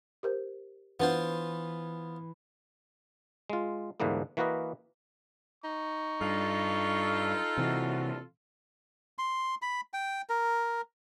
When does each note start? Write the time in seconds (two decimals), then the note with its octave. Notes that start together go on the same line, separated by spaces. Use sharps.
0.23 G4 A#4 C5
1.00 E3 B3 D4 F4 B4 C5 F#5
3.50 G#3 F4
4.00 D2 G#2 D3 E3 A#3 B3
4.37 E3 A#3 F#4 A#4 B4 D#5
5.64 D#4 C#6
6.21 G2 F4 A4
7.58 C3 E3 F#4
9.18 C6
9.62 B5
9.93 G5
10.29 A#4